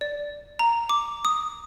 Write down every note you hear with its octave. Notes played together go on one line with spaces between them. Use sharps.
D5
A#5
D6
D#6